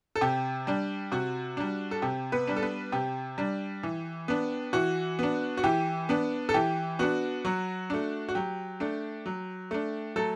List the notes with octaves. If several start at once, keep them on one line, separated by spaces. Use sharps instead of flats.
A4
C3 G4
G3 D4
C3 F#4
G3 D4
A4
C3 G4
B3 B4
G3 D4
A4
B3 B4
C3 G4
G3 D4
E3
B3 D4
E3 F#4
B3 D4
F#4
E3 G4
B3 D4
A4
E3 G4
B3 D4 F#4
F#3 F#4
A3 D4
F#4
F#3 G4
A3 D4
F#3
A3 D4
F#3 A3 A4